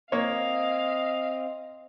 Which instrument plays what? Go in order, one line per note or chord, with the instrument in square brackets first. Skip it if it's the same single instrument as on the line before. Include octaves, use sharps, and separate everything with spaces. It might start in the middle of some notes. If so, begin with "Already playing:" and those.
[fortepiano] A#3 C#5 [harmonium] C4 [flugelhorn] D#5 [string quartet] F5